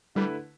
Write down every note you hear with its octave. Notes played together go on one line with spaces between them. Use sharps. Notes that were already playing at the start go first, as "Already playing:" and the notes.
D3 G3 A3 E4 B4